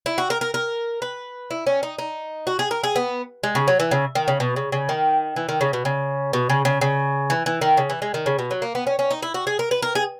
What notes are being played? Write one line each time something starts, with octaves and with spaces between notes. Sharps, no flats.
E4
F#4
A#4
A#4
A#4
B4
E4
C#4
D#4
D#4
F#4
G#4
A#4
G#4
B3
G#3
C#3
F#3
E3
C#3
D#3
C#3
B2
C#3
C#3
D#3
E3
D#3
C#3
B2
C#3
B2
C#3
C#3
C#3
E3
E3
D#3
C#3
E3
G#3
D#3
C#3
B2
F#3
A#3
B3
C#4
C#4
D#4
E4
F#4
G#4
A#4
B4
A#4
G#4